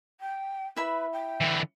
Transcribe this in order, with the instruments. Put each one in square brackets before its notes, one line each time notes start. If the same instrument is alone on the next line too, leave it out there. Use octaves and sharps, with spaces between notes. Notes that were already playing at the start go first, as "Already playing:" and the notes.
[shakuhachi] G5
[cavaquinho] E4 E5 B5 [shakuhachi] B4
[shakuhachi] G5
[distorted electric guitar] D3 E3